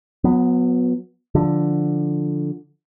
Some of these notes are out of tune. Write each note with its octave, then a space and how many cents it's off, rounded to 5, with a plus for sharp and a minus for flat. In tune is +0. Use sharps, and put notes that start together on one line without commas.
F#3 -30 B3 +0
D3 +0 F3 +0